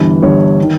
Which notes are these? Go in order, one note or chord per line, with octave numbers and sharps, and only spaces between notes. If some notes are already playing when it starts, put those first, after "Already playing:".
Already playing: G1 G2 E3
G1 G2 E3 C#5
D#3